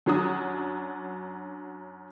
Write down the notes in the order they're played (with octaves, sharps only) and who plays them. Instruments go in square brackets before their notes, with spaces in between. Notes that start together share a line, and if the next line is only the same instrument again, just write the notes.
[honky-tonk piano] F#2 F#3 D4 D#6